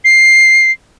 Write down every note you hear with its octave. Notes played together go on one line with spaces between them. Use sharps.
C7